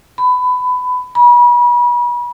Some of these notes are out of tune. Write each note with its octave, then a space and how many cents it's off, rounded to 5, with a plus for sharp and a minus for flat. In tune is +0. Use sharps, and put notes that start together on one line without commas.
B5 +20
B5 -35